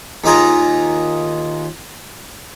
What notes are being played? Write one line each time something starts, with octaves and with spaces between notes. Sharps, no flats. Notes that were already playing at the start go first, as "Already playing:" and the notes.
D#2 D#3 F4 G#4 A#5